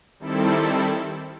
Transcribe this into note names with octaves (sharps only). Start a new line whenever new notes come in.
D#3 G3 C4 E4 A4